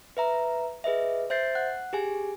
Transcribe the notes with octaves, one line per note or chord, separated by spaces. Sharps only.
B4 E5 A#5
G#4 B4 D#5 E5
C5 E5 G6 A6 C7
F#5 F#6
G4 G#4 G#5